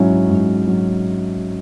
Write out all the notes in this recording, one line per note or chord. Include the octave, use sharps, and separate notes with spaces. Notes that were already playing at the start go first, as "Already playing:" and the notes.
Already playing: G#2 F#3 C#4 E4
G#2
F#3